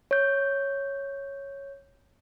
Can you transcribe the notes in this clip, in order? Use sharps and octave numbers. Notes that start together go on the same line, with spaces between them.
C#5 G6